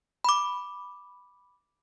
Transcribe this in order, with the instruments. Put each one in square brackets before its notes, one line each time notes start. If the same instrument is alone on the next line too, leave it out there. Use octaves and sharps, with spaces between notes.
[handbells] B5 D6